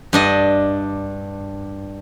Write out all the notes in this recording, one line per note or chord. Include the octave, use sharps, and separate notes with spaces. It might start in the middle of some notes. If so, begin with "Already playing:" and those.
G2 D4 D#5